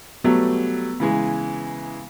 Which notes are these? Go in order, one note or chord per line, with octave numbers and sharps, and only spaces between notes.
F#3 G3 A3 B3
C#3 E3 G#3